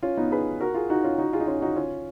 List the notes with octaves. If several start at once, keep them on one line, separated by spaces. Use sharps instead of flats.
C#4 F4
B3 D#4
G#4 B4
F#4 A#4
F4 G#4
D#4 F#4
C#4 F4
D#4 F#4
F4 G#4
D#4
C#4 F4
D#4 F#4
C#4 F4